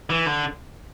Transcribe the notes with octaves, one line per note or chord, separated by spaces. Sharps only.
E3
D3